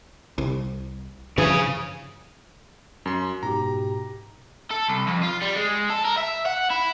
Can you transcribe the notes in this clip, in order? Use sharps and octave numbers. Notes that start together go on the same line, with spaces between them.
C2
G2 C#3 E3 F3 G#4
F#2 C6
G#2 B2 G4 A#5
A4
C2
F2
F4
G3
G#3
A4
A#4
E5
F#5
E4